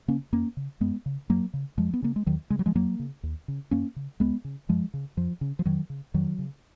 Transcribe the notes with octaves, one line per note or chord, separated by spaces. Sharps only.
C#3 A#3 C#4
F2 A#3 C#4
C#3
F#2 G#3 B3
C#3
F#2 F#3 A#3
C#3
F2 F3 G#3
B3
C#3 A#3
G#3
D#2 D#3 F#3
C#3 G#3
F#3
F3 G#3
F2 F#3 A#3
C#3
D#2
C#3
F#2 A#3 C#4
C#3
C#2 G#3 B3
C#3
F#2 F3 G#3
C#3
F2 F3
C#3
F3
F2 D#3 F#3
C#3
F2 D#3 F#3
C#3